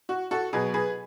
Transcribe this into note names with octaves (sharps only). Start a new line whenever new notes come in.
F#4
F#4 A4
B2 F#3 G#4 B4
G#4 B4